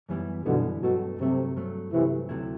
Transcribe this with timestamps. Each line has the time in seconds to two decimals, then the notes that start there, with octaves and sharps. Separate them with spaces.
0.09 F#2 E3 G3 B3 E4
0.46 F#2 B2 D3 E3 G3 B3 E4
0.82 G2 B2 F#3 A3
1.19 G2 C3 F#3 A3
1.56 G2 F#3 A3
1.93 G2 C3 E3 F#3 A3
2.29 D2 C3 F#3 A3 E4